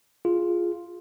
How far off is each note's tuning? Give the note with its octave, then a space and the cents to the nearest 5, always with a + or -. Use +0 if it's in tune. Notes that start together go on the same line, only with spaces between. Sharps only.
F4 +0 G#4 +0